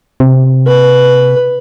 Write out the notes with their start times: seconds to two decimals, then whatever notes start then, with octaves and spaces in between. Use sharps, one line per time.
0.20 C3
0.67 B4